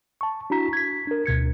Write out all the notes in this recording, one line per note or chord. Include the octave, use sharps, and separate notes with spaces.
A5 C#6
D4 E4 F#4 A#5 B6
G#6 B6
D4 A#4
D2 B2 G#6 C#7